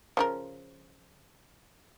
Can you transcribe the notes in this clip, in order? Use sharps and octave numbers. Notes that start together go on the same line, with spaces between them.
C#3 F3 A#4